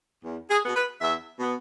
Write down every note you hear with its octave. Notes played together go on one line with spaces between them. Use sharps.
E2
G#4
B2 B3
B4
E2 E5
B2 B3